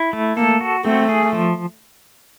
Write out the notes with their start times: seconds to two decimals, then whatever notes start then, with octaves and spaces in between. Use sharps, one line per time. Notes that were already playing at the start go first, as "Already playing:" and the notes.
Already playing: E4
0.13 A3
0.37 A#3 A4
0.61 F#4
0.84 A3 C4
1.09 G#4
1.33 F3